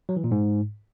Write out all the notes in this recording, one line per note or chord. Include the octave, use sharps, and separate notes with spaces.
F#3
E3
A#2
G#2